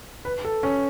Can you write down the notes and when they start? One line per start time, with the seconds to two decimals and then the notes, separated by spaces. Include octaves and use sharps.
0.25 B4
0.45 A4
0.63 C#4